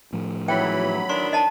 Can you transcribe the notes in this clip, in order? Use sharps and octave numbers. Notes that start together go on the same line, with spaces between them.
A2 F3
G#2 E3 F#3 G5 B5
D#3 E3 D4 C6
D#5 A5 A#5